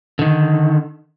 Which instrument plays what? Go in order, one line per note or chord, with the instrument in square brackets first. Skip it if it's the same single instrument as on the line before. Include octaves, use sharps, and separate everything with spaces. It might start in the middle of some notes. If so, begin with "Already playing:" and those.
[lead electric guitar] D3 D#3